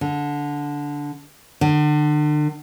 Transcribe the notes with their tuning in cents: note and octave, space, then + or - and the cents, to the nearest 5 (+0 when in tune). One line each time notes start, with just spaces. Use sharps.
D3 -10
D3 +35